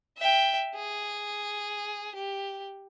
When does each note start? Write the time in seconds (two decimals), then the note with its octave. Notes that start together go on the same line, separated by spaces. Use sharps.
0.18 E5 G5
0.76 G#4
2.15 G4